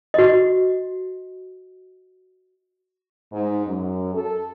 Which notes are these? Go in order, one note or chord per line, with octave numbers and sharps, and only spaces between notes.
F#4 D#5
G#2
F#2
A4